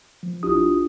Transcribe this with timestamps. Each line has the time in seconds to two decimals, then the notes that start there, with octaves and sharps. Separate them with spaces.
0.23 F3
0.43 A1 D4 E4 F4 G4 D#6